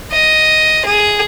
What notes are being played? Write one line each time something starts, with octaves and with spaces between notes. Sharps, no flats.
D#5
G#4